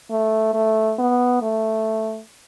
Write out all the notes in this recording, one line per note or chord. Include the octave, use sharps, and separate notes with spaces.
A3
A3
B3
A3